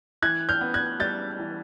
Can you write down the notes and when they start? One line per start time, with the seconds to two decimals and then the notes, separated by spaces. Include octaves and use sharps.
0.22 E3 F#6 G#6
0.49 F6 G6
0.61 B3
0.74 F#6 G#6
1.00 G3 G6 A6
1.39 E3